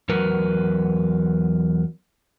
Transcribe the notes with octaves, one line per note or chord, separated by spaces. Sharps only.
E2 F#3 F#4 A#4 B4